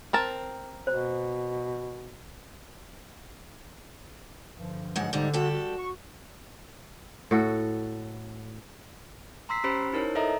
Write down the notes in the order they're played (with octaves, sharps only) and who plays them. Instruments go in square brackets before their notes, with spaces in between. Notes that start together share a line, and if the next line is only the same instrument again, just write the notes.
[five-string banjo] C4 A#4 A5
[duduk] B2 [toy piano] C5
[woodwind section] G2 D3 F3
[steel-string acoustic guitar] G#2 F#3 F#5 [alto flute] G#3
[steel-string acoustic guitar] G#2 G3 [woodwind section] D3 [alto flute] D#4
[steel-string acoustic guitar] G3 G4 A4 [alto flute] F#4
[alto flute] F#4
[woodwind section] C#6
[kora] A2 F#4 A4
[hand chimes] A#5 C6 E6 B6 C7
C#4 G4 C5 B5
D#4 E4 A#4 C5 C#5
A4 D#5 E5 A#5